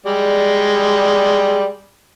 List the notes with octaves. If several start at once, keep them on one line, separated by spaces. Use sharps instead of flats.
G3 G#3 D5